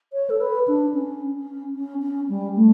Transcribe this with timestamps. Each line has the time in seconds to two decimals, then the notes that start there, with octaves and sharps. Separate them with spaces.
0.13 C#5
0.30 A4
0.40 B4
0.68 D4
0.94 C#4
1.35 C#4
1.75 C#4
2.02 C#4
2.29 G3
2.56 A3